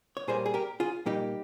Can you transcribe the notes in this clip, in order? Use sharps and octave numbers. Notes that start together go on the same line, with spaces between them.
C#5
A#2 G3 A#3 G#4 C5
G#4
G4 A#4
F4 G#4
A#2 G3 A#3 D#4 G4